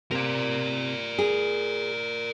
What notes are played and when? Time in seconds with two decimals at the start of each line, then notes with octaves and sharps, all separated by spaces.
0.11 C3 A#4 D5
1.19 G#4